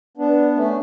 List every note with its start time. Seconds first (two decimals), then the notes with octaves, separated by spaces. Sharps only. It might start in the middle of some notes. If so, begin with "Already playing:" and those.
0.17 B3 D4
0.56 A3 C#4